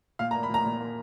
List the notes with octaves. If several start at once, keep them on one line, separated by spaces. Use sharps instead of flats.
A#2 F5
A#5
A#3
B5
A#2 A#5
A#2
A#3